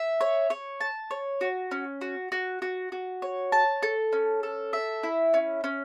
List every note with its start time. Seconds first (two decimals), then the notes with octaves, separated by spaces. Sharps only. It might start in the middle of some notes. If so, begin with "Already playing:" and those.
Already playing: E5
0.21 C#5
0.50 C#5
0.81 A5
1.11 C#5
1.41 F#4
1.71 C#4
2.01 F#4
2.32 F#4
2.62 F#4
2.92 F#4
3.22 C#5
3.52 A5
3.83 A4
4.13 C#4
4.43 A4
4.73 E5
5.03 E4
5.34 C#4
5.64 C#4